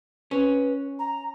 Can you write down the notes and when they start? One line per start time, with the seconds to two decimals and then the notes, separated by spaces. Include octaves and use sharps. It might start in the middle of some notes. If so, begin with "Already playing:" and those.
0.31 C#4 B4
0.99 A#5